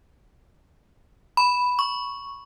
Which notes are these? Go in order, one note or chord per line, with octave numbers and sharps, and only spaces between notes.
B5
C#6